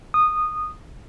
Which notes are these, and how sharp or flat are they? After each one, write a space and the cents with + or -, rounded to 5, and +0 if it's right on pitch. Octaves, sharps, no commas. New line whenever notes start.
D#6 -15